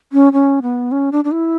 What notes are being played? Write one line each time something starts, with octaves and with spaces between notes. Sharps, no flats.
C#4
C#4
B3
C#4
D4
D4
E4